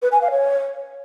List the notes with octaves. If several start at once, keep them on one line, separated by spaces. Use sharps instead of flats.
B4
G#5
F5
C#5